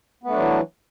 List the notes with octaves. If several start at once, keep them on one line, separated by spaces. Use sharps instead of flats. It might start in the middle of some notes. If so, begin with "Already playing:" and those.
E3 F#3 A3 B3 D4